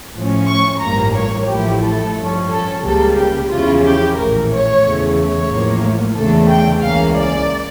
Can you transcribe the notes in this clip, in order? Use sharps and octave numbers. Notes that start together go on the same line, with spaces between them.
A2 F3 C#4
C#6
A1 G2 F3 A#3 A#5
C#5
A1 A2 F3 A3 E4 G4
A4
G2 F3 C#4
A4
C#2 C#3 G3 A#3 A4
G4
E2 C#3 F3 C#4 E4 F4
G4
A#1 A2 E3 A#4
C#5
E2 C#3 E3 A3
C#5
A1 A2 F3 A#3
E2 C#3 E3 A3 D4 A4
G5
C#2 C#3 E3 A#3 C#4 F5
D5